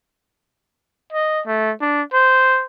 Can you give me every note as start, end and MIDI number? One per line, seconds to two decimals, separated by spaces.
1.12 1.41 75
1.46 1.71 57
1.81 2.02 62
2.13 2.65 72